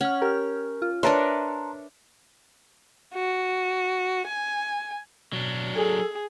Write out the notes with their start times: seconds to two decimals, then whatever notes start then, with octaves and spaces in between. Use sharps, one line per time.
0.01 C#4 F#5 F6
0.22 G4 A#4 F6
0.82 F4
1.03 D4 A#4 B4 C#5 E5 A5 A#5 C6
3.14 F#4
4.27 G#5
5.33 B2 F#3 D4
5.76 G#4 A4